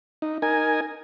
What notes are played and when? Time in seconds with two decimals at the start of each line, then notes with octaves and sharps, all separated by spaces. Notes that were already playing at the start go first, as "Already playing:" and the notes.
0.22 D#4
0.42 D#4 A#4 G#5